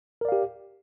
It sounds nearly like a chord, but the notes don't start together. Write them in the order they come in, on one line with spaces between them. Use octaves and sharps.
A#4 D5 F5 G4